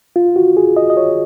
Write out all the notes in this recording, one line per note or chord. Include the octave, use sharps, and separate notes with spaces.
F4
F#4
G#4
D#5
D#5
C#5